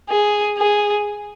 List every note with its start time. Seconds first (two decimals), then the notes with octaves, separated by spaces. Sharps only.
0.09 G#4
0.58 G#4